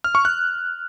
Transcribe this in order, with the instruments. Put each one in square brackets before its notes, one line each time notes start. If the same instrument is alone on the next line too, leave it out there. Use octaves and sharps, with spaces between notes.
[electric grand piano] F6
C#6
F#6